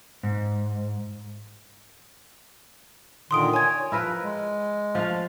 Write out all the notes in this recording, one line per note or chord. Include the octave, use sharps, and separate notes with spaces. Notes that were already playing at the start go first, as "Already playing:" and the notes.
G#2
A#2 D3 D#3 C6 D#6 D7
C#5 G#5 G#6
F3 E4 A#4 B4
G#3
F3 A3 F5